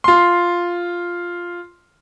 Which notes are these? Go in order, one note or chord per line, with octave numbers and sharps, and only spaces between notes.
F4 C6